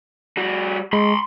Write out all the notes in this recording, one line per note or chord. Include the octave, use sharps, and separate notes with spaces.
G3 F#4
G#3 B5 C6